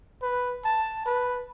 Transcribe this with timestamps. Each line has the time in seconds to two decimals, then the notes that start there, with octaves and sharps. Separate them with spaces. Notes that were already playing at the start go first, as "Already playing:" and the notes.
0.22 B4
0.65 A5
1.06 B4